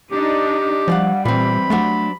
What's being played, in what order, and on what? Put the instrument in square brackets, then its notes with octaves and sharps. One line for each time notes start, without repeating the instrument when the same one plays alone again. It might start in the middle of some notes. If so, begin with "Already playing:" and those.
[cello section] D4 D#4 [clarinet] G4
[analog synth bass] F3 [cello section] G3 [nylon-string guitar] D5 F5 F#5
[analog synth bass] A#2 [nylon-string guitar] E3 C4 [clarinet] B5
[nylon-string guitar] F#3 D4 C5 [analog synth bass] A3